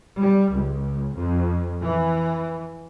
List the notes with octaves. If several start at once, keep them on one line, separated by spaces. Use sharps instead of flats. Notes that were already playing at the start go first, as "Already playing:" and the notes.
G3
C#2
F2
E3